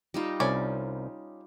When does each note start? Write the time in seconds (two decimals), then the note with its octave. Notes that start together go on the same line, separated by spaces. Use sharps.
0.14 G3 D#4 F4
0.40 C2 C#4 D5